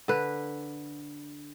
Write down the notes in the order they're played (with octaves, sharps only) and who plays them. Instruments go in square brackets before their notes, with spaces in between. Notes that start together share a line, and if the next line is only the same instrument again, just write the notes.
[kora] D3 B4